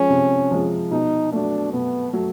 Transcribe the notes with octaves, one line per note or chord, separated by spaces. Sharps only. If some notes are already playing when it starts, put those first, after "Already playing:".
Already playing: F3 G#3 C#4
C3
F3 G#3
B2 D#4
F#3 A3 D4
B2 B3
F#3 A3